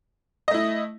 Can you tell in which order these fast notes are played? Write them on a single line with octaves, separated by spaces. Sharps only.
D#5 A3 E4